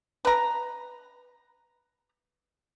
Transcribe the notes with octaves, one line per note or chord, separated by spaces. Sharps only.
B4 A#5